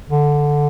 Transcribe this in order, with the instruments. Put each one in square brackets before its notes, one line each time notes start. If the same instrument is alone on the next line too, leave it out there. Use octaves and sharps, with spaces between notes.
[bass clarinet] D3